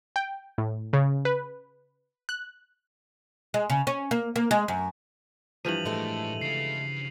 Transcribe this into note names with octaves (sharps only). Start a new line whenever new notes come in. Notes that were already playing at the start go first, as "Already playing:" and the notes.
G5
A2
C#3
B4
F#6
G#3
C#3
C#4
A#3
A#3
G#3
F#2
G2 E3 F3 D#7 F7 F#7
A2 G#3 A3 A4
C#3 F5 C7 F7